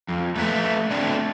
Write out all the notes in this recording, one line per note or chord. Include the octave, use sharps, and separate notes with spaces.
F2
A3 A#3 B4 D5 E5
A3 C4 D4